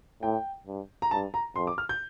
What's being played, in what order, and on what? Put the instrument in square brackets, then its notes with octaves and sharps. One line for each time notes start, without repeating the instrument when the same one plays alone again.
[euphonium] A2 [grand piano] G5
[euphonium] G2
[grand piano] A#5
[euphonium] G2 [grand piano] A5
[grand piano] A#5
[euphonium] F2 [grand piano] C6
[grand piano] D6
F6
G6